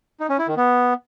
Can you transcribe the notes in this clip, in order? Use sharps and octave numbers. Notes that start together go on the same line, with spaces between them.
D#4
C#4
E4
D#3
B3